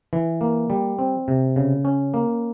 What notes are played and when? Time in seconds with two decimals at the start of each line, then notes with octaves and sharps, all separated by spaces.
0.13 E3
0.41 A#3
0.70 G3
0.99 C4
1.28 C3
1.56 C#3
1.85 C#4
2.14 A#3